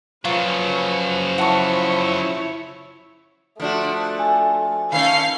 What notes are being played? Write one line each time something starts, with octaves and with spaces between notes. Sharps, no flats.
C#3 F3 F#3 F4 B4 C#5
E4 C#5 F#5 A5 C#6
F3 A3 D4 F#4
G#5
D#3 A3 C#4 F5 C7